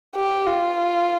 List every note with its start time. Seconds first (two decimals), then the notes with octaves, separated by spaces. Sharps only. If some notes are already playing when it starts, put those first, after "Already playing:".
0.16 G4
0.47 F4